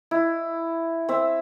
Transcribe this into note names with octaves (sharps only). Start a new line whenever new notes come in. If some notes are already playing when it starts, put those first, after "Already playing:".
E4
C4 E5